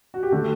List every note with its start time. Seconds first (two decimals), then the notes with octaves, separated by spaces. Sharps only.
0.14 F#4
0.23 G4
0.32 D3 A3 A4